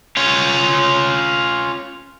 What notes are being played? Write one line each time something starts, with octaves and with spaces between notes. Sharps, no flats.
C#4 F4